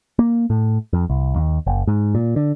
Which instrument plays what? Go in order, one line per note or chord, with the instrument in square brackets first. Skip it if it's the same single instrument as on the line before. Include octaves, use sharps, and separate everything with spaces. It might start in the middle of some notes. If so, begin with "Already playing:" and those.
[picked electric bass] A#3
A2
F2
C2
D#2
F#1
G#2
A#2
D3